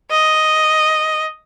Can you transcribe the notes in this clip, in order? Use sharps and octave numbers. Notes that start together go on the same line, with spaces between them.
D#5